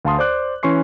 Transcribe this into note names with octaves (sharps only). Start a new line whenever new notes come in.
D2 F5 A5 C6 D#6
C5 D5 D6 F#6
E3 C#4 C6 C#6 C7